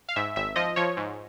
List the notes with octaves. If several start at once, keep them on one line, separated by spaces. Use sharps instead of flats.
F5
G#2 E5
G#1 E5
F3 D#5
F3 C#5
G#2